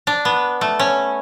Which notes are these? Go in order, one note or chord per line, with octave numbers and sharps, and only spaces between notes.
D4
B3
A3
C#4